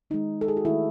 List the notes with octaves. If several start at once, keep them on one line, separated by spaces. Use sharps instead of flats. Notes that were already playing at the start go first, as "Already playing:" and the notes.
D#3 G#3 D#4
A4
G#4
F#4
D#3 A3 E4